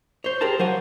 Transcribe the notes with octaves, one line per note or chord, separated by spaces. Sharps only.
C5 C#5
G4 G#4 A#4 C5 A5
F#3 C5 F5 F#5 G#5